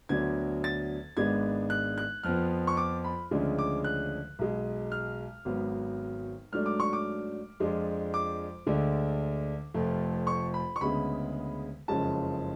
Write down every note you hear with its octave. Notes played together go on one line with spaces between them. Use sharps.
D2 D3 F#3 B3 D4 G#6
A6
G#1 G#2 G#3 B3 D4 G#6
F#6
F#6
F2 F3 B3 F6
C#6
D6
B5
D2 C#3 F3 G#3 D4
D6
F#6
B1 B2 G#3
F6
G#1 G#2 F#3 B3
G#2 F#3 A3 D4 F6
D6
C#6
D6
F2 F3 G#3 D4
D6
D2 D3 G#3 D4
F1 F2 F3 A3
C#6
B5
C#6
D2 C#3 G#3 B3 B5
F#1 F2 C#3 G#3 C#4 A5